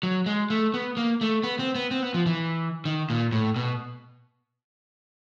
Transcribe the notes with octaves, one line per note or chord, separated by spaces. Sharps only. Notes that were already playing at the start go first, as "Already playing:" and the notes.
F#3
G#3
A3
B3
A#3
A3
B3
C4
B3
C4
B3
F3
E3
D#3
A#2
A2
B2